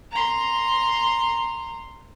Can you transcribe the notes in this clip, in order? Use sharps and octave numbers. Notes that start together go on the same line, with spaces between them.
A#5 C6